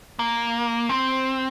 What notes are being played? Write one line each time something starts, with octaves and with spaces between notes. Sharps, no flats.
A#3
C4